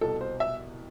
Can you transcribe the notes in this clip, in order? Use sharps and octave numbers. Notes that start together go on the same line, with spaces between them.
C2 B2 A4
C5
E5